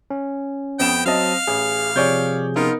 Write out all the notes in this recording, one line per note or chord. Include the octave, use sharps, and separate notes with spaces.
C#4
F2 B3 G5 E7
F#3 C4 D#5 F5 A5
A1 G#4
C3 F3 G#4 C#5 D5 G6
B3 D#4 F4 A#4